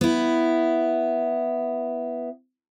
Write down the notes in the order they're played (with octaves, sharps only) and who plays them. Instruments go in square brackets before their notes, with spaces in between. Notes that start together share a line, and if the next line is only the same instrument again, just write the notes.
[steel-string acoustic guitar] B3 E4